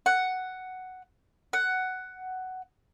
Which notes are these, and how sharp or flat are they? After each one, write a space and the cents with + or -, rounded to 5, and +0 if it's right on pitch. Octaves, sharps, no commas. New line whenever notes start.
F#5 +5
F#5 +10